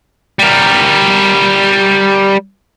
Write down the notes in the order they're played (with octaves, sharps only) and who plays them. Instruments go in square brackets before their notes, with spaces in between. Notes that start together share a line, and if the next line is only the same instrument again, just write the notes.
[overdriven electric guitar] G3 A#4